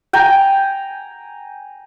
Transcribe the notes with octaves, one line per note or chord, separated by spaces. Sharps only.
G5 G#5 A#5